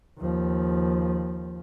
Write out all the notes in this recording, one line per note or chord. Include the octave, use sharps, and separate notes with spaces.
D#2 F3